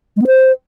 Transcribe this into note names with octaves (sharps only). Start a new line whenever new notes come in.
G#3
B3
C5